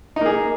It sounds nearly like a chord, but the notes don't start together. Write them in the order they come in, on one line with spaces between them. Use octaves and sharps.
D#4 A#3 G#4